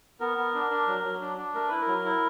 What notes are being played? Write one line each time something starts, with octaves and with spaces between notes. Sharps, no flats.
B3 A#4
B3
D4
D4
F#3
F#3
D4
D4
A3 A#4
E4 B4
A#4
F#3
E4